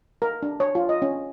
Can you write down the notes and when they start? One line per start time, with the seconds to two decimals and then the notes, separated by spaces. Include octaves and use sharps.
0.22 A#4
0.42 D4
0.60 C#5
0.75 F4
0.89 D#5
1.02 C#4